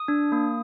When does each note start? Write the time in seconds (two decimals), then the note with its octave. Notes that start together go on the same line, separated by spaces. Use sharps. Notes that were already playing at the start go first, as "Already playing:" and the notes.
Already playing: D#6
0.08 D4
0.32 A#3